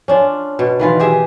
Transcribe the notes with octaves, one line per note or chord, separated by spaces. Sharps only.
C#4 D4 F4
B2
D#3 E3 F4
G4 G#4 E5